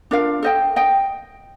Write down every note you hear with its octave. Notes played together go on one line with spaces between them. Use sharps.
D4 F4 A#4 F5
A4 C5 D#5 G5
D#5 G5